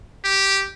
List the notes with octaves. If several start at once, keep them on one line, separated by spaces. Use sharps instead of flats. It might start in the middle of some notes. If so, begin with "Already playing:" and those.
G4